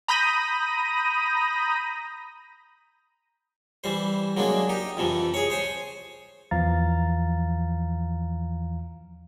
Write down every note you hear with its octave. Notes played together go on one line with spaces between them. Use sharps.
A#5 B5 D#6 G6 A#6 D#7
E3 G3 C5
F#3 G#3 A#3 D4
D#4 G4
F2 C3 E3 F3
G#4 C#5
C5 C#5 G#5
E2 E3 F3 F5 A#5 A6